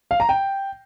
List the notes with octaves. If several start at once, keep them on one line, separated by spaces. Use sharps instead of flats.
F5
A#5
G5